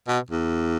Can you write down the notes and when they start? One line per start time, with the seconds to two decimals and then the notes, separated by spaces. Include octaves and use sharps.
0.08 B2
0.30 E2